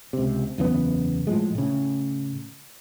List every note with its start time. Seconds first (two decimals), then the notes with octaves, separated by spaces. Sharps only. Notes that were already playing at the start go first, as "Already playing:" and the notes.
0.13 C#2 C3
0.58 F#1 E2 C#3 B3
1.27 A2 F3 G#3
1.55 A2 C#3